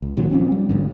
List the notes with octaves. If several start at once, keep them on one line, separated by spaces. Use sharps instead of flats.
C#2
A#2 D#3 F#3
F3 C4 C#4
G3
A1 G#2 D3